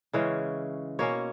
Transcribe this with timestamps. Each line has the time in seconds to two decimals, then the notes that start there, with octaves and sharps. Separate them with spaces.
0.13 C#3 E3 G#3 C#4
0.99 B2 A#3 C#4 C#5